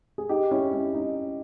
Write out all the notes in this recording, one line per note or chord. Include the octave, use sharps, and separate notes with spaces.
G#4
D#4 G4
C#4 E4
C#4
D#4